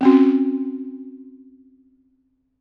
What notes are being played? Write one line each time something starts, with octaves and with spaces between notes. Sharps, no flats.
C4 C#4 F#4